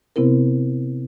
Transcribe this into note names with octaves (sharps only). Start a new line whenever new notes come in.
C3 B3 C4 E4 A#4